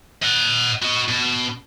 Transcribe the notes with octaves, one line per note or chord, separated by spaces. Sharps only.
D#5 F#5
F#4 D#5
B2